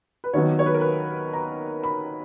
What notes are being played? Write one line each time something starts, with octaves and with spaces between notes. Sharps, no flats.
B4
D#2 D#3 F#3 B3 C#5
C#5
B4
A#4
B4
A#5
B5